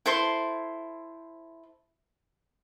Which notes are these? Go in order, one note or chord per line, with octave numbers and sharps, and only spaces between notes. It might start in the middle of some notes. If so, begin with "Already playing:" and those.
E4 A4 C5 C6